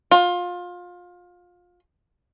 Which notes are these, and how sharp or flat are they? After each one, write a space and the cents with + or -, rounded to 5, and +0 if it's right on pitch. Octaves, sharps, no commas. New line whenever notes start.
F4 +25